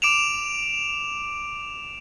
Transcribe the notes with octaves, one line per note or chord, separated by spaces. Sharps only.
D6 D7 E7 F7